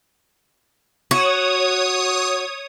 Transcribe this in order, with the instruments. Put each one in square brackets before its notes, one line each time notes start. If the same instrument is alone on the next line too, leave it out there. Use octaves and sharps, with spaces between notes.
[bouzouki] F#4 [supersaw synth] C#5 D#6